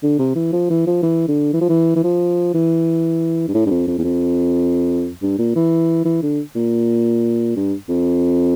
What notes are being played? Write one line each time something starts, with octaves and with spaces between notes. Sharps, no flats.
D3
C3
E3
F3
E3
F3
E3
D3
E3
F3
E3
E3
F3
E3
G2
A2
G2
F2
F2
E2
F2
G2
A#2
E3
E3
D3
A#2
G2
F2